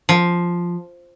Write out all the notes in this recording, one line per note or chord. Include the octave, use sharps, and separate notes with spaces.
F3